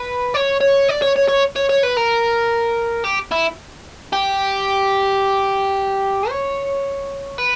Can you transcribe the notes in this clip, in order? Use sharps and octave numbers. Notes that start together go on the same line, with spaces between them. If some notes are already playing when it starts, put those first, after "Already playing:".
Already playing: B4
C#5
C#5
D5
C#5
C#5
C#5
C#5
C#5
B4
A#4
G4
E4
G4
C#5
B4